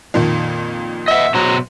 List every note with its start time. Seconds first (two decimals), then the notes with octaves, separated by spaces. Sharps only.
0.14 F2 A#2 D#3
1.08 D#5 E5 F#5
1.34 B2 F#3 C5 A#5